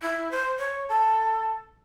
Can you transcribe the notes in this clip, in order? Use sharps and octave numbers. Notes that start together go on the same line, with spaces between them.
E4
C5
C#5
A4